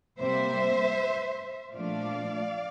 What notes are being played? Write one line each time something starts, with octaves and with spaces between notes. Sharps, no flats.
C3 G3 A#3 C5 E5
A#2 F3 A3 D4 D5 F5